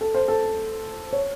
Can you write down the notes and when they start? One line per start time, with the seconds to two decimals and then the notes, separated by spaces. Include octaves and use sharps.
0.01 A4
0.15 C5
0.28 A4
1.13 C#5